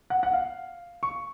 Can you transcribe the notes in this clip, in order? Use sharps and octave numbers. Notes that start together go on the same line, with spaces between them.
F#5
F#5
F5
C#6